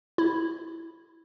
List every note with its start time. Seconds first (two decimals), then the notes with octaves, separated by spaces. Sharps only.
0.18 E4